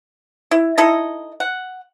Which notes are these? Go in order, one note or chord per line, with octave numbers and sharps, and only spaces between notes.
E4
D#4 E4 A4 D#5
F#5